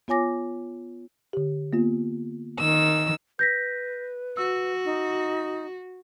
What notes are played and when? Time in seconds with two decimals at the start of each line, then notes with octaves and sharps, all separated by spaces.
0.08 B3 F4 C#5 G#5 D6 A#6
1.33 D3 G4
1.73 A#3 B3 F4
2.59 D#3 E6
3.39 B4 G6 A#6 B6
4.37 F#4 E6
4.85 D#4